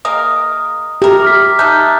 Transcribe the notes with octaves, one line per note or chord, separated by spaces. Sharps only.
G#3 A#3 A#4 D#6
E4 G4 A#4
D6 F6 B6
A3 D#4 A#5 F#6 G6